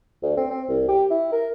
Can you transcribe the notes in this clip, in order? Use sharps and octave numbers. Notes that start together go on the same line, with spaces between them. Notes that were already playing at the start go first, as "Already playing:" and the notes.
D2
C4
C4
C2
G4
E4
A#4